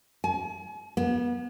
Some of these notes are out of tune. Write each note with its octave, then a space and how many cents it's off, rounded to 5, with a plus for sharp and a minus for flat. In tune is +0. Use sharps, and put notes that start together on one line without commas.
G#5 +40
B3 -35